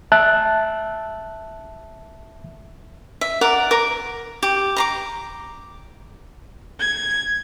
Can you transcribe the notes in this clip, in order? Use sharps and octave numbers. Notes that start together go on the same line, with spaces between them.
E5 A5 F#6
E5
A#4 D5 F#5
A#4 D6
G4
A#5 C6 D6
G#6